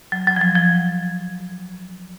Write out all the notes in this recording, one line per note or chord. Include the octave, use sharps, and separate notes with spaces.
F#3
F#3
F3
F#3
F3